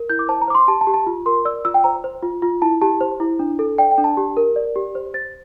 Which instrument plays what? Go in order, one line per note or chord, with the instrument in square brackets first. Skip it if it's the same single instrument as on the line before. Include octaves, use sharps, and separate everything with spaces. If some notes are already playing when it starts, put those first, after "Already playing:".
Already playing: [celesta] A#4
E4 G6
D6
C5 A5
A#5
C5 D6
C6
G4 A5
A5
G4
A5
F4
A#4 C6
D5 E6
F4 E6
G5
C5 A#5
C5
F4
F4
E4 A5
G4 A5
C5
E4
D4
A4
D5 G5
G5
D4
A5
G4
A#4
D5
G4
C5
C5 A6